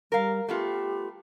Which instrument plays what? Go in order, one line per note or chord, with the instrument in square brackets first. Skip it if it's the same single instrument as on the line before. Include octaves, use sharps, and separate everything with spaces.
[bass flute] G3 [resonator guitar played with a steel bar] A#4 F5
[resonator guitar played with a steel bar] A3 B3 F4 [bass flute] G4